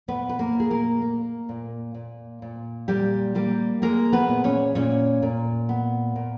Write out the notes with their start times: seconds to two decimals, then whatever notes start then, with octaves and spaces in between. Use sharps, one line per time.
0.08 A#2 B3 B4
0.29 B4
0.39 A#3 A#4
0.55 A#2 G#4
0.70 A#3 A#4
1.02 A#3
1.49 A#2
1.94 A#2
2.42 A#2
2.88 A#2 G3 G4
3.35 G3 A#3 G4
3.82 G#3 A#3 A#4
4.12 B3 B4
4.29 A#2
4.44 C#4 C#5
4.75 A#2 C#4 C#5
5.22 A#2
5.69 B3
6.16 A#2